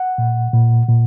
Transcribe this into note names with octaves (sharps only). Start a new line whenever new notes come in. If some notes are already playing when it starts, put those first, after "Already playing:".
Already playing: F#5
A#2
A#2
A#2